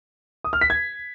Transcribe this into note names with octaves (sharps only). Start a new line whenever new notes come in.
D#6
F6
B6
G#6